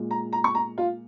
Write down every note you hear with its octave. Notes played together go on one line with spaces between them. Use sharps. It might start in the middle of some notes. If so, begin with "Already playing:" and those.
Already playing: A#2 G#3
A#5
A#5
C#6
A#5
F4